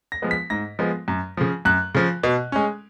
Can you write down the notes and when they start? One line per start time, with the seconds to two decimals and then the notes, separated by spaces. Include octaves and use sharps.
0.12 A#6
0.22 F3 G#3 B3
0.31 B6
0.50 G#2 A#6
0.79 F3 G#3 B3
1.08 F#2
1.37 C#3 F3
1.65 F#2 F#6
1.95 C#3 F3
2.23 B2
2.52 G#3 C#4